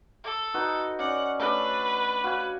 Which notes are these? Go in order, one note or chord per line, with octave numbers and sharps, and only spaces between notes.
A4
D#4 F#4 B4
C#4 C#5 D5 F#5
A3 D4 B4
F#4 F5 G#5